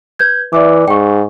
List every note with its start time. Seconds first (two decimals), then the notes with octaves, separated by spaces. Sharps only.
0.19 B4 G6 G#6
0.53 E3 D5 E5 D6
0.88 G#2 G5 C#6